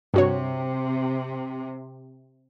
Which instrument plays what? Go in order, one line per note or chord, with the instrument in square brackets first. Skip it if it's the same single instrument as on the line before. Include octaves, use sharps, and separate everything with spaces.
[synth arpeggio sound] G2 F#4 C#5 [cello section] C3